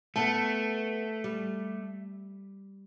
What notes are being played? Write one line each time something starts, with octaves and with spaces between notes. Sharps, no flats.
A3 B3 A5
G3